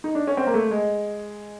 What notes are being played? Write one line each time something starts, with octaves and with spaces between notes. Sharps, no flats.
D#4
D4
C#4
C4
A#3
A3
G#3